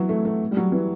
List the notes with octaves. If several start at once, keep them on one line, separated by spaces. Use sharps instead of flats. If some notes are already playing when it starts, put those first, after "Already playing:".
Already playing: E3 F#3
A3
A3
G3
F#3
E3